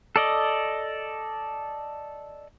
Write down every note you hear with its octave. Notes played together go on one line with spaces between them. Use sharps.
A4 D5 D#5